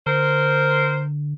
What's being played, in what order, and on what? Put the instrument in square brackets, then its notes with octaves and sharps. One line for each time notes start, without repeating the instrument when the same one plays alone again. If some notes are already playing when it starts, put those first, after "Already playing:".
[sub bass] D3 [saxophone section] A#4 C5